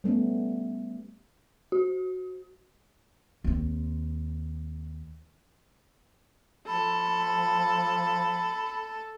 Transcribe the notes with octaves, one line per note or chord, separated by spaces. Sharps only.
G3 A3 B3 C#4
F#4
D#2 C4
F3 A4 B5